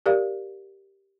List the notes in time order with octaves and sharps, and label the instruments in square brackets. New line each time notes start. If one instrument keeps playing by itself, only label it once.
[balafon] G4 A#4 D5 F5